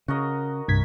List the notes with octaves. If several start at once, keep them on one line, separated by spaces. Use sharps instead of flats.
C#3 F#4 A#4 D#5
C2 G2 G#6 B6